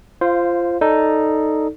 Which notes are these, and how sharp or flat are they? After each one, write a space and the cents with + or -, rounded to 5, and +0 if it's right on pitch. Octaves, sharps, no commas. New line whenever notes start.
F4 -20 C5 +0 F5 +5
D#4 +0 A4 +5 D5 +0